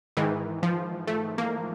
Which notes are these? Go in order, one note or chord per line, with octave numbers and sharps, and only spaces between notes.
G#2 D#3 E3
F3
A3
A#3